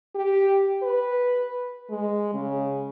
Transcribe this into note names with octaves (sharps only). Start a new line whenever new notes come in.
G4
B4
G#3
C#3